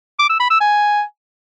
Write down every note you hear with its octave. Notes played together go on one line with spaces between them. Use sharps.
D6
E6
B5
E6
G#5